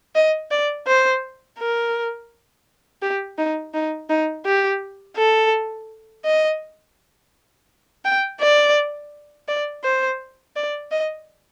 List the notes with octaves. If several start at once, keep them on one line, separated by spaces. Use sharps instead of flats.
D#5
D5
C5
A#4
G4
D#4
D#4
D#4
G4
A4
D#5
G5
D5
D5
C5
D5
D#5